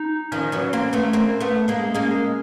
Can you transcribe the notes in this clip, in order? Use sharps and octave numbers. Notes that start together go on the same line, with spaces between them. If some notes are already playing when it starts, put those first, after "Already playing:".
Already playing: D#4
D#3 F3 C#4
E3 F#3
A#3 C4
A3 B3
A#3 C4
A3 B3
G#3 A#3
G#3 A#3 C#4